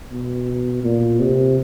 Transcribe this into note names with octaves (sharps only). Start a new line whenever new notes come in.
B2
A#2
C3